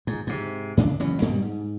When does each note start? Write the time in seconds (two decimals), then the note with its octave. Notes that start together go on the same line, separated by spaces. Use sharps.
0.07 G#2
0.27 G#2 C3
0.77 G#2 C#3 D4
1.00 F#1 E3 F#3 C#4
1.21 D2 G2 B2 G3
1.42 G#2